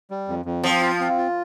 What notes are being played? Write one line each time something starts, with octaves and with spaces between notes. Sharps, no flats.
G3
F2
F2
F3 C4
F4
C4
F4